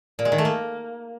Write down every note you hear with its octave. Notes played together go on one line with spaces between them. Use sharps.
A#2
G#3
D#3
A3
A#3